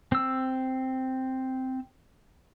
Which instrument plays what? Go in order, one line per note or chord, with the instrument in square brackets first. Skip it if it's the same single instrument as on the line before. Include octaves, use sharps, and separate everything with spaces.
[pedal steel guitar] C4 E6